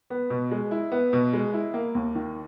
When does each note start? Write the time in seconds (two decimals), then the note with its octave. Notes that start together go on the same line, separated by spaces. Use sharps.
0.10 B3
0.30 B2
0.51 G#3
0.71 E4
0.92 B3
1.13 B2
1.33 G#3
1.54 E4
1.74 A#3
1.95 D#2
2.15 D#3